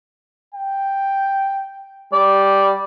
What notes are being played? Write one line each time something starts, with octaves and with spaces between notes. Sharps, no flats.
G5
G3 D5